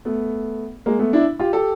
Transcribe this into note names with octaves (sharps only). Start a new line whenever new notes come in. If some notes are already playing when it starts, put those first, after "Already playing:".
A3 B3
G#3 A#3
A3 B3
D4 E4
F4 G4
G4 A4